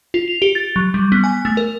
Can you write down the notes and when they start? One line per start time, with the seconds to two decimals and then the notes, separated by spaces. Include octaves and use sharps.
0.14 F4
0.28 F7
0.42 G4
0.55 A6
0.76 F#3
0.94 G3
1.12 B3
1.24 G#5
1.45 A3
1.57 A#4